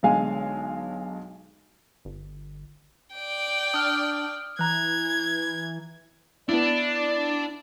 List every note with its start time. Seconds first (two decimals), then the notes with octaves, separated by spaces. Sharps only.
0.03 B1 D3 G#3 F5 G#5
2.05 G1
3.14 D5 G5
3.74 D4 D#6 F6
4.59 E3 A#5 F#6 G#6
6.49 B3 D4 E4 D5